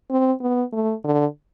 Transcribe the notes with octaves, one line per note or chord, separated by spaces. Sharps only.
C4
B3
A3
D3